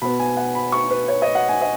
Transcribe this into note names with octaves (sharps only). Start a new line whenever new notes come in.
B2 B3 B5
G#5
F#5
B5
C#6
B4
C#5
D#5
F#5
G#5
D#5